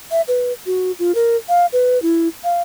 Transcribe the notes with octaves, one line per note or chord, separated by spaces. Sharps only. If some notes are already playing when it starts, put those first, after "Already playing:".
E5
B4
F#4
F4
A#4
F5
B4
E4
F5